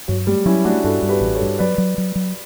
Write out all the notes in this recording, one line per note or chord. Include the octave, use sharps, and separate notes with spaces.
G2 F#3
G3 A3
F#3 C#4 E4
A3 D4 F#4
G2 F#4 A4
G2
G4 B4
A1
A4 C#5
G2
F#3 B4 D5
F#3
F#3
F#3